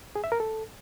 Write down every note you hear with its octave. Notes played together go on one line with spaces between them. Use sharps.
G#4
E5
A#4
A4